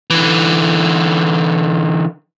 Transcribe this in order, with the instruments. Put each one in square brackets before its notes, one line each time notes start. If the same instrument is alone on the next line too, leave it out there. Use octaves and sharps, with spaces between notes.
[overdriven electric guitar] D3 E3